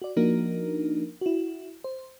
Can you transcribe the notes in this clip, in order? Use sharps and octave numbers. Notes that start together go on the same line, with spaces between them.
F#4 D5
F3 A#3 D4 D#4 F#4 A#4
E4 F#4
C5